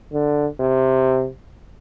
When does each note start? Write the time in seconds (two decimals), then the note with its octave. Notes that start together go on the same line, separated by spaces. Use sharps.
0.12 D3
0.60 C3